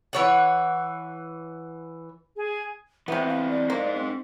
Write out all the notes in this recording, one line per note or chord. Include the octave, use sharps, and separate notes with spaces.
E3 C#5 F#5
G#4
C3 E3 B3 C4 E5
F5
D5
A#3 D#4 C5
C4